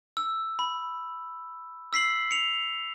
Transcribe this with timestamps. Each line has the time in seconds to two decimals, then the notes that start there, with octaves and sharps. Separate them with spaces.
0.17 E6
0.59 B5
1.93 E6 B6 C7 F#7
2.31 C#7 F7